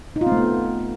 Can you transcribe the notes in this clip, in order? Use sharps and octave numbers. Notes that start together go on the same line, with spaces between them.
D#4
F4
C4
A3
B3